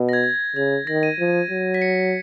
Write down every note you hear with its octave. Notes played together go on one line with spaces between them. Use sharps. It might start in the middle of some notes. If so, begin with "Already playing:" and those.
Already playing: B2
A#6
G#6
G#6
C#3 G#6
D#3 A#6
D#7
F3
F#3
B6
C#7